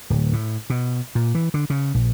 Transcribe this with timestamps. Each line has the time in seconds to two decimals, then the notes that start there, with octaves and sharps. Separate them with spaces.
0.10 D1
0.33 A2
0.70 B2
1.15 A#2
1.35 E3
1.54 D3
1.70 C#3
1.94 A#1